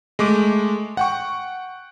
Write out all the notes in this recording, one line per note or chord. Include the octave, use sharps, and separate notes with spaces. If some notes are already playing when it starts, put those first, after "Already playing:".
G#3 A3 D6
F#5 G5 C#6